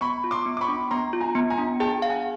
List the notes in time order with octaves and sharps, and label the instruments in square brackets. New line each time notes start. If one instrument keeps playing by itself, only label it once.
[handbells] B3 [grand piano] B5 C#6
[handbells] F4
[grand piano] C6 D6
[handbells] B3
[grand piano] D6
B5 C#6
[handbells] D4
[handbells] B3 [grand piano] A#5 C6
[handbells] F4
[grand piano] G#5 A#5
[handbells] B3
[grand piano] G#5 A#5
[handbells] D4
[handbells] G#4 [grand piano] G5 A5
[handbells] F5
[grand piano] F#5 G#5